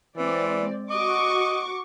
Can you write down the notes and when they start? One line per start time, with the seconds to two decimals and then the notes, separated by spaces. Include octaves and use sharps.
0.17 E3 G#3 C4 D5
0.91 F#4 D#5 C#6 D6